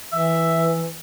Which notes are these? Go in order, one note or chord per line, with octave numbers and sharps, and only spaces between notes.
E3 E5